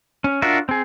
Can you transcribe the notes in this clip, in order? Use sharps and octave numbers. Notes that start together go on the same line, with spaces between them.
C#4
D4 F4 F#4 A#4 E5
C4 G#4